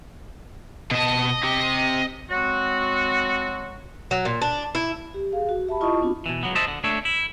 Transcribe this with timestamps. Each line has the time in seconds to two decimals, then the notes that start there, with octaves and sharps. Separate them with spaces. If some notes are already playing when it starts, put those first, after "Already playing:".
0.91 B2 D#5 A5
1.44 C4 G4
2.30 F#3 G#3 C4 F#4
4.11 F#3
4.25 A#2
4.42 D4
4.75 E4
5.14 G4
5.32 G#4 F5
5.49 F#4
5.67 G4 E5 A5 B5
5.81 E4 F4 D#5 A5 C#6 D#6
6.01 B3 C4 D4 F4 F#4
6.26 B2 E3
6.43 C#2 F#3 B3
6.55 C5 D#5 E5 A5
6.68 D3
6.84 A3 D4 C#5 E5
7.05 E4